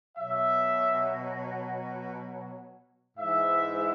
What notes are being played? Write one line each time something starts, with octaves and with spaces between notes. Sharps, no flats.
B2 F#3 E5
G#2 E3 E5